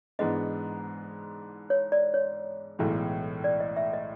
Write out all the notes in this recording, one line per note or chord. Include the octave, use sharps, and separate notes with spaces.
G#2 E3 G#3 B3 D4 D#5
C#5
D5
C#5
B1 A2 E3 G#3
D5
D#5
E5
D#5